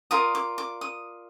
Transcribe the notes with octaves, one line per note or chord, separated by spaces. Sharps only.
F4 A#4 D5 D#6
D6
D6
D#6